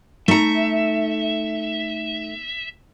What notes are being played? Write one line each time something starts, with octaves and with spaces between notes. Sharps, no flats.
A3 D#4 E5 A#5 C#7